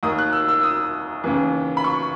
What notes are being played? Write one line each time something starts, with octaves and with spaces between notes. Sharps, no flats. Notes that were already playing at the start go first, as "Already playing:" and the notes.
D#2 D#3 D#6
F#6
E6
E6
D#6
D#2 C#3 E3
B5
C#6